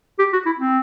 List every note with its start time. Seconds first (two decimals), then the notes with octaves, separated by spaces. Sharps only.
0.19 G4
0.33 F#4
0.46 E4
0.59 C4